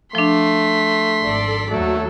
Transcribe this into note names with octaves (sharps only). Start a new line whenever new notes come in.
F3 A3 D4 C6 B6
G#1 A4 D5
D#2 F#3 A3 A4